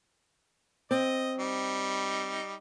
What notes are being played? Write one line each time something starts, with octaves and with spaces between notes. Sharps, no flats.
C4 D#5
G3 D#4